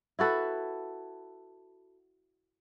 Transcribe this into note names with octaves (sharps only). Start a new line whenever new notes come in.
E4 F#4 A4 B4